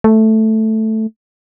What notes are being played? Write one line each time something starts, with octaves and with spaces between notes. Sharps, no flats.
A3